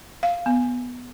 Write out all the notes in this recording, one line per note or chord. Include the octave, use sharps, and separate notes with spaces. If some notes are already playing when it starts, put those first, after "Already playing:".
F5
B3